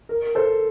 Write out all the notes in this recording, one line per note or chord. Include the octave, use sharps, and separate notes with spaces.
A#4
A4 C5